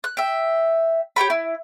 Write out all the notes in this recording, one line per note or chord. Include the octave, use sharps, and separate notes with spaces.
F#6
E5 G5
G4 C#5 G5 B5
E4